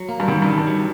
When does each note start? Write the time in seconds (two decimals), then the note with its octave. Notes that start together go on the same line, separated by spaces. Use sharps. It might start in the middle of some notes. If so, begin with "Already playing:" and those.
Already playing: F#3
0.09 A#3
0.20 G2
0.28 F#2 D#3
0.42 G2 D#3
0.58 G2
0.67 F#3